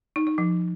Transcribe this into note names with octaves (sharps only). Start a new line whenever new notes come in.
D#4
D#4
F3